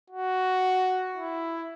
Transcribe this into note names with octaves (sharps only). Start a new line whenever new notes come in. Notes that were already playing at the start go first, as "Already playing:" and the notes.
F#4
E4